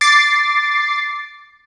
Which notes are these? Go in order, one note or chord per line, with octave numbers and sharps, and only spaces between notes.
D6 A6 C7